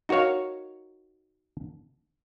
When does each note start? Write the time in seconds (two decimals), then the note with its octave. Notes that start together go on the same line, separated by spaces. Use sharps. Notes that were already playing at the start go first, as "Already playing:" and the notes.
0.09 D#4 F#4 A#4 C#5 F5